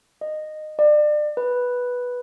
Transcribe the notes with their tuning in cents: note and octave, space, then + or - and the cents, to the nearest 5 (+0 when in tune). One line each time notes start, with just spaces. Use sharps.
D#5 -15
D5 +30
B4 -5